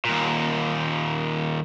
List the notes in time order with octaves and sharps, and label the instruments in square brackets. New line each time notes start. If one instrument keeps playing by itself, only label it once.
[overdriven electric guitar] D#2 A#2